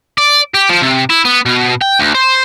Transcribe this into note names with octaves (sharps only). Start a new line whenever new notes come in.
D5
G4
F3
C3
E4
B3
B2
G5
D2
C5